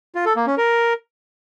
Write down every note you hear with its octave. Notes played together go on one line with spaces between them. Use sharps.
F4
A4
A#3
C#4
A#4